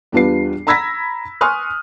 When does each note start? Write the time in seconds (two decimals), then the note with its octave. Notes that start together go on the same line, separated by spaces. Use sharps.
0.12 E2 G3 D4 F4 B4 C7
0.67 A#5 B5 E6 G#6 A#6 B6
1.41 G#5 C6 C#6 D#6 F6 F#6